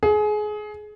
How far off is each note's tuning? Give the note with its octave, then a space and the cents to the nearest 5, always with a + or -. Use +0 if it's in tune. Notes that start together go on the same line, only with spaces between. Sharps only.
G#4 +25